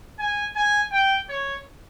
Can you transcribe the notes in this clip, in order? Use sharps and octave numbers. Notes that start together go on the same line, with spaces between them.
G#5
G#5
G5
C#5